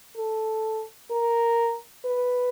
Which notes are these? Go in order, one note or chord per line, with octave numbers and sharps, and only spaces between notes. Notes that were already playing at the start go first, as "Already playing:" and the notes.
A4
A#4
B4